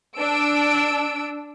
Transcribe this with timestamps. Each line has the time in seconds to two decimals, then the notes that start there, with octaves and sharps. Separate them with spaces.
0.18 D4 E6 D7